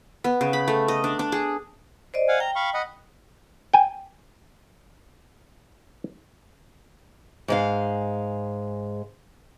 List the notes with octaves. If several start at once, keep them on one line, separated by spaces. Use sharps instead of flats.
B3
C#3
B5
A3
D#5
D4
D4
G#4
C5 D5 D#5
F5 F#5 G#5
G5 A#5
F5 B5 C#6
D#5 F#5 B5
G5 G#5
G#2 G#3 F5